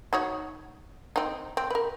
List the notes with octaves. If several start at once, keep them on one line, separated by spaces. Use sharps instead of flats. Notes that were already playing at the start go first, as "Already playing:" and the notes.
D#4 F#4 C#5
C4 D#4
C4
A#4 B4